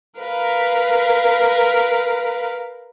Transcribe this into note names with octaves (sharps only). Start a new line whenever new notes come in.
A#4 B4 F5